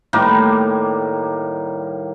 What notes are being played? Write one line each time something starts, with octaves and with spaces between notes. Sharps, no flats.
A2 D#3 G3 A#3